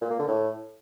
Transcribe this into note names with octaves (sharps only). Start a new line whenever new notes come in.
A#2
A#3
D3
A2